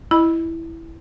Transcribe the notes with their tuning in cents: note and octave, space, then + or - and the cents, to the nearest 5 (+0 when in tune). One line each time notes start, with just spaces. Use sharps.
E4 +0 D#5 +0 B5 -15